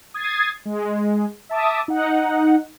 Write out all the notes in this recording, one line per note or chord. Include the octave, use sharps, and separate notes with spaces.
D#6 G#6 A6 C7
G#3
E5 A5 D6 D#6
D#4 F#5